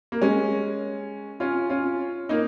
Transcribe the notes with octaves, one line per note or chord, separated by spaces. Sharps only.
A#3
G#3 C#4
C#4 F4
C#4 F4
A#3 D#4